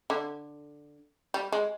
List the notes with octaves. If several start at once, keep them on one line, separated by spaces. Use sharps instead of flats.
D3
G3
G#3